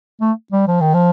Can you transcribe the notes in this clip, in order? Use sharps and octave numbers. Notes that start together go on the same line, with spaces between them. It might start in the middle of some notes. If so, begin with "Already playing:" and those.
A3
G3
F3
D#3
F3